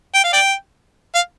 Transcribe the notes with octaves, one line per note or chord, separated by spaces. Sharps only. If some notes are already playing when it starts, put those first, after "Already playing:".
G5
F5
D5 G5
F5